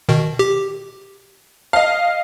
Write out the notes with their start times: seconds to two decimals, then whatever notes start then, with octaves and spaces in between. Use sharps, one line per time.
0.09 B2 D#3
0.39 G4
1.73 D#5 F5